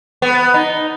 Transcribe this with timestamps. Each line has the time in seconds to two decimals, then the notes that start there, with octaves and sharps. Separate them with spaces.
0.22 B3
0.54 D#4